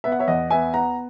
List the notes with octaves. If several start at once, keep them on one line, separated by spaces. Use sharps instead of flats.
B3 E5
F#5
C#5 E5
E2 D#5 F#5
B3 E5 G#5
B3 F#5 A#5